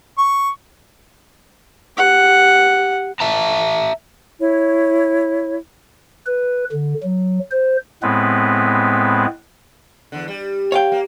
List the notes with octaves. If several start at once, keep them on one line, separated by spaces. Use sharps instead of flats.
C#6
G4 F#5
E5 A5 A#5
E4 C#5
B4
D3
F#3
C5
A2 G#3 B3 C4 B4
E2 D3
G3
C#5 F5 G5
A#3